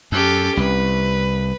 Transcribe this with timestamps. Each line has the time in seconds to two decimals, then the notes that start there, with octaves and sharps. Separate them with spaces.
0.12 F#2 C#4 G4 A4
0.57 C2 B4